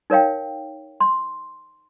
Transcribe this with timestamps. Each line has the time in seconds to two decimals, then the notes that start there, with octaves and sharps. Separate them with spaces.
0.10 D#4 A#4 C#5 F5 G5
1.01 C6